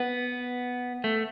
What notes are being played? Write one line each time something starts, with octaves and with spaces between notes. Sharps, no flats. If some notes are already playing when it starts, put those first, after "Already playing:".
Already playing: B3
A3